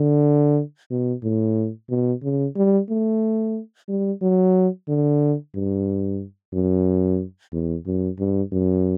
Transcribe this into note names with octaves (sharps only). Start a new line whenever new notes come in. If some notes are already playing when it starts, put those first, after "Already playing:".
Already playing: D3
B2
A2
B2
C#3
G3
A3
G3
F#3
D3
G2
F#2
E2
F#2
G2
F#2